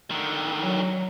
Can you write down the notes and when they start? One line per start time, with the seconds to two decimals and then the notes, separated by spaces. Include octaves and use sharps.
0.11 D3 D#3
0.59 F#3